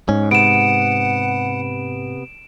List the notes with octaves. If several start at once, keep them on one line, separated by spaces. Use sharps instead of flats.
G#2 C#4
C3 B3 F#5 D7 E7